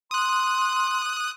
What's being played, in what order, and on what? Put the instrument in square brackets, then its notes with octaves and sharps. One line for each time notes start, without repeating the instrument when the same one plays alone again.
[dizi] C6 [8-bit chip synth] D#6 F#6